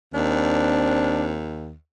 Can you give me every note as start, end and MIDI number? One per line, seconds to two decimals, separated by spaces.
0.14 1.74 39
0.14 1.40 60
0.14 1.27 62